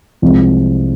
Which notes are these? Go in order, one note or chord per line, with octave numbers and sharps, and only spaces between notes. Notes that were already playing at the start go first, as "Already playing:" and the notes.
C2 C3 F3 G#3